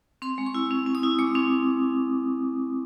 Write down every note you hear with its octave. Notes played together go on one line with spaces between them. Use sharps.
C4 C6
G#3
C#6
E4
C4
C4
D#6
E4
G#3 D6
C4 D6